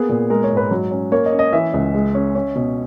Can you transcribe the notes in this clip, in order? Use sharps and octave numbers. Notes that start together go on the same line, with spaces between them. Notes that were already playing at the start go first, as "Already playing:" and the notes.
Already playing: A#3 B3 G#4
A#2
G#3 A#4
C#5
G#2
B4
F#3
C#4
A#3 C#5
D#5
C#4
D#5
E3 E5
C#2
G#3
C#4
C#4
B2